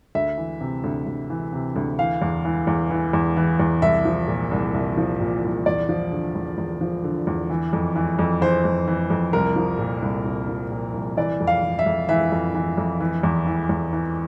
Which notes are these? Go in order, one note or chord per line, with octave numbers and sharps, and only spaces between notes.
D2 E5
E3
C3
D2
D2
E3
C3
D2
E3 F5
E2
E3
E2
E3
E2
E3
E2
C2 E5
F3
A#2
C2
C2
F3
A#2
C2
E2 D5
F3
D3
E2
E2
F3
D3
E2
E3
F2
E3
F2
E3 C5
F2
E3
F2
C2 A#4
F3
A#2
C2
C2
F3
A#2
C2
E3 D5
F2
F5
E3
E5
F2
E3 E5
F2
E3
F2
E3
E2
E3
E2
E3